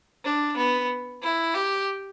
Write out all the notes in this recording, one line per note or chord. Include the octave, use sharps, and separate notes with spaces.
D4
B3
E4
G4